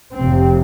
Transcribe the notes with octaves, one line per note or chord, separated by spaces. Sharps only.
F1 F2 C3 C4